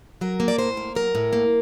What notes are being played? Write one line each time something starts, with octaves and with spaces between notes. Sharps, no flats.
F#3 A#4
A#3
D5
A2 C5
A#3
F#3 A#4
A2
A#3